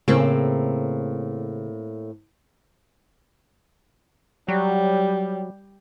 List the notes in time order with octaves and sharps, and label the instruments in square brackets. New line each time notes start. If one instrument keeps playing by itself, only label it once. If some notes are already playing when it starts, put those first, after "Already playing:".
[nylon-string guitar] A2 A#3 C4 [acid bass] C#3
[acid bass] F#3 [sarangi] G3